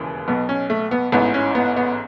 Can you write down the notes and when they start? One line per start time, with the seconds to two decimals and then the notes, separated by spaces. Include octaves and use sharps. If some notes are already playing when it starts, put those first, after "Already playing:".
Already playing: E1 D#2 C#3 E3
0.28 B1 B2 B3
0.49 C#4
0.70 A3
0.91 B3
1.12 A1 G#2 E3 B3
1.34 C#4
1.55 B3
1.76 B3